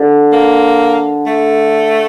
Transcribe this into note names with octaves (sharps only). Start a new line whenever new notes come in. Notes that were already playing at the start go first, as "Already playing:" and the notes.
Already playing: D3
A#3
A3